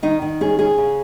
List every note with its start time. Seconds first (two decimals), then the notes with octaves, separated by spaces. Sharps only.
0.03 D#3 D#4
0.22 D#3
0.41 C#4 G#4
0.59 C#4 G#4
0.78 C#3